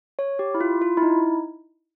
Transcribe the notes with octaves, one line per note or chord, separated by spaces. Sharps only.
C#5
G4
E4
F4
F4
E4
D#4